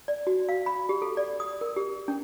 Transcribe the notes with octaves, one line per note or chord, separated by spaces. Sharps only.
D5
F#4
F5
B5
G4
A4
D5
D#6
A#4
G4
C#4